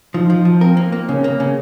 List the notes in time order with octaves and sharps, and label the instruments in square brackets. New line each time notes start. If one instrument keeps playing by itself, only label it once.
[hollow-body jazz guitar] F3 [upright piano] D#4
[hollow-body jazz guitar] F3
F3
[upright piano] C4 [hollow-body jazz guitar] A#4
[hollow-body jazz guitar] A#3
A#3
[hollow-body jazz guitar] C#3 [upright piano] C#4
[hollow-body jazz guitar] A#3
C#3